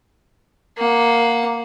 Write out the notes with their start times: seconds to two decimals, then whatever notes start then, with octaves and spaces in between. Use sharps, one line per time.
0.78 A#3 F#5